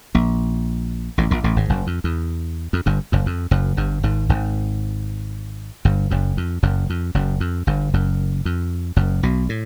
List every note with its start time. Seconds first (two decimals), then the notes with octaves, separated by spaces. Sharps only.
0.15 A#1 A#2
1.18 A1 A2
1.31 A#1 A#2
1.44 A1 A2
1.56 G#1 G#2
1.69 F#1 F#2
1.87 F2
2.04 E2
2.73 F2
2.86 G1 G2
3.12 F#1 F#2
3.26 F2
3.51 F#1 F#2
3.77 G1 G2
4.03 G#1 G#2
4.29 G#1 G#2
5.85 G1 G2
6.11 F#1 F#2
6.37 F2
6.63 F#1 F#2
6.90 F2
7.14 F#1 F#2
7.40 F2
7.67 G1 G2
7.93 F#1 F#2
8.45 F2
8.96 F#1 F#2
9.23 B1 B2
9.49 A2